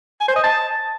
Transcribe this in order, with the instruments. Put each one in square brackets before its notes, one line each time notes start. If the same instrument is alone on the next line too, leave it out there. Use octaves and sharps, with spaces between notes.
[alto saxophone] G#5
C5
D#5
A5